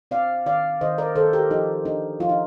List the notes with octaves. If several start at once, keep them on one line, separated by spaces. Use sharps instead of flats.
C4 D5 F5
D#3 D5 F5
D#3 C5 D#5
A#4 D5
D#3 A4 C5
G4 A#4
F3 D#4 G4
D4 D#4
F3 F4
D#4